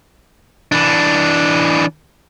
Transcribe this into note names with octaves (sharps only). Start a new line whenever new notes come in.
E3 D4